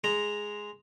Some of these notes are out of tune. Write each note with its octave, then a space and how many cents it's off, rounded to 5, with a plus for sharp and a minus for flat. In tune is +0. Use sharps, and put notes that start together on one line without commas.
G#3 +0 A#5 +0